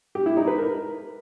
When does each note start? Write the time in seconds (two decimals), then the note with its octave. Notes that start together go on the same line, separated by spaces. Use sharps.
0.15 G4
0.26 E4
0.37 D#4
0.47 B4
0.58 A#4